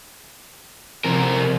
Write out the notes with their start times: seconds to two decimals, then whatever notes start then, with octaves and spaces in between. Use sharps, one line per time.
1.04 C3 F3 C4 A#4